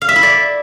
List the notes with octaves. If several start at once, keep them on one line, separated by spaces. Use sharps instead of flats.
F5
E5
E4
D5